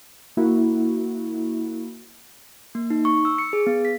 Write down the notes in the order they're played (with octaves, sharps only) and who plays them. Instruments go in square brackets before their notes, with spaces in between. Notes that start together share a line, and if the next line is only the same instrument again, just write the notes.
[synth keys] A#3 E4 F#4
[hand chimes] A#3
D#4
C#6
E6
C#7
G#4
B3
B6